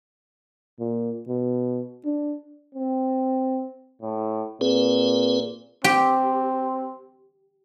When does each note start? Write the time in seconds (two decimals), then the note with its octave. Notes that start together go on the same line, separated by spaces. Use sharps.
0.79 A#2
1.28 B2
2.05 D4
2.74 C4
4.02 A2
4.61 A#2 C4 G#4 B4
5.84 C4 G4